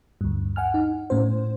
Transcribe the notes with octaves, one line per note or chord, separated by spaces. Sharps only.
D2 G2
F#5 G#5 F6
D#4
A2 C#4 C5